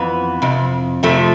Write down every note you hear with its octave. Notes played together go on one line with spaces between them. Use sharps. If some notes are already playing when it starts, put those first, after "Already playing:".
Already playing: F2 E3 B3
F2 C3
F2 C3 F3 A3